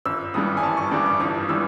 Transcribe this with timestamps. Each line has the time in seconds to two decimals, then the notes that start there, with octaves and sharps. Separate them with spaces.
0.05 G1 E6
0.34 G2 E3 G3 D#6
0.57 G#5
0.62 G1 A5
0.77 C#6
0.91 G2 E3 G3 D6
1.06 D6
1.20 G1 D#6
1.49 E3 G3 E6